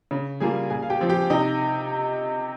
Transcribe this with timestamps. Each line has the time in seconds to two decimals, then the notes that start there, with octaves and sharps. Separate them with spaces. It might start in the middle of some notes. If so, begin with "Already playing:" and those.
0.11 C#3
0.40 G3 A#3 F4 G#4 G#5
0.70 A#2 G#4 G#5
0.82 F5
0.90 G4 G5
1.01 F3 C4
1.09 G4 G5
1.30 C3 D#4 D#5